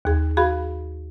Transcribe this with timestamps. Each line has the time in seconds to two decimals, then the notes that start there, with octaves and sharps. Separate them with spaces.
0.05 D#2 G#4
0.37 F#4 G#4 F5 B5